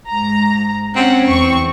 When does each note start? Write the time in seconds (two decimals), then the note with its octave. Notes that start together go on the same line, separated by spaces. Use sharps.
0.11 G#2 A#5
0.96 C4 C#4 F#5
1.28 E2 C#6